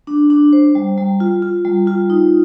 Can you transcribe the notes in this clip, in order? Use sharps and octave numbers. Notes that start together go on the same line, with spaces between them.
D4
D4
C5
G3
G3
F4
F4
G3
F4
D#4